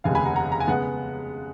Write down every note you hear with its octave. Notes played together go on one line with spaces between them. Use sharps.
F1 D#2 C#3 F5 G#5
G#5 B5
F#5 A#5
F#5 A#5
A#5
G#5
C#3 G#3 B3 F#5